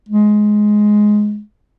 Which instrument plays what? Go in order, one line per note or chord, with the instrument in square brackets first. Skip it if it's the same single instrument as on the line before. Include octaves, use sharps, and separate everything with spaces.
[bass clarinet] G#3